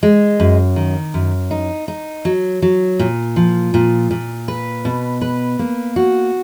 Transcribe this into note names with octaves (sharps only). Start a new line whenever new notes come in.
G#3
F#2
D#3
F#2
D#4
D#4
F#3
F#3
A#2
F3
A#2
A#2
B4
B2
B4
A#3
F#4